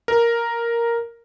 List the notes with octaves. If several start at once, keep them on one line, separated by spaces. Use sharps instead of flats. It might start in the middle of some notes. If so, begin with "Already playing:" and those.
A#4